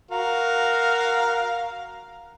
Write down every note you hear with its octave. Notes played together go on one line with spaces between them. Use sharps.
F#4 A#4 F5